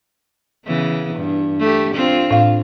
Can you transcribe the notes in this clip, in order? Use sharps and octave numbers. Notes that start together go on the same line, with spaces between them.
C#3 E3 B3
G2
A3 G4
C4 D4 F4
A2 F5